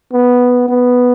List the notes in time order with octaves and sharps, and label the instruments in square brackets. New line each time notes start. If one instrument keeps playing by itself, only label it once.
[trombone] B3
B3